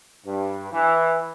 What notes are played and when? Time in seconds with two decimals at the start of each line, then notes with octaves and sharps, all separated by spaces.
0.25 G2
0.71 E3